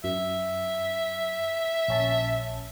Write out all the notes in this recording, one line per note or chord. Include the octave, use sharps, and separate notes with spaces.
F#2 E5
A#1 C#4 A5